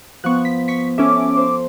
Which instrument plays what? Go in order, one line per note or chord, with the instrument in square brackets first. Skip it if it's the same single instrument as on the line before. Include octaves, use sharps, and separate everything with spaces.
[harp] F3 B3 [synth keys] C#6 F#6
[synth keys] B6
C#6 B6
[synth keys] C#4 E5 [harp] A4 [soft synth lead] D6
[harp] C5